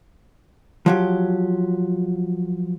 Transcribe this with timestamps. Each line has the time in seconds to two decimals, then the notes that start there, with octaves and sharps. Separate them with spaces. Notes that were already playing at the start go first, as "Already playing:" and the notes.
0.86 F3 F#3 G4